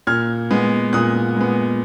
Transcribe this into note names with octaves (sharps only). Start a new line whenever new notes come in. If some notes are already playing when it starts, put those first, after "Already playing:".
A#2 F6 G#6
G#3 B3
A#2 D#6 F#6
G#3 B3